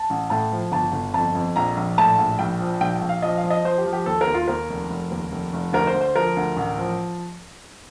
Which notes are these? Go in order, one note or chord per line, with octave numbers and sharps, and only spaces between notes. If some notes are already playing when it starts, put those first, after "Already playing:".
Already playing: A5
A1
A2 A5
F3
G1 A5
G1
F2 A5
F2
A#1 A#5
A#1
A2 A5
A#1
A#1 G5
F3
A#1 G5
G5
A#1
F5
F3 D#5
F5
F3
D#5
F3 C5
G4
F3
G4
D#2 A4
A#4
D#2
F4
D#2 A#4
F1
F1
D#2
F1
F1
D2 A#4
C5
D2
C5
F3 A#4
D2
A1
F3